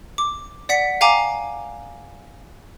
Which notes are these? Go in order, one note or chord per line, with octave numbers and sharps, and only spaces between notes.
D6
D5 F#5 B6 C#7
F5 G5 G#5 A#5 D6